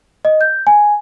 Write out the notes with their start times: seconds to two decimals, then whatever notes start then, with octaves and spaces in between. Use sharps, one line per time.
0.25 D#5
0.41 G6
0.67 G#5